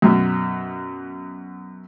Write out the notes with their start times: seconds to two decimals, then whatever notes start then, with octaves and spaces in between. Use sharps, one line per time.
0.02 F#2 B2